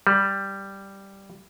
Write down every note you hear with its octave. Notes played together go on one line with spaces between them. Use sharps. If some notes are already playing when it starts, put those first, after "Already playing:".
G3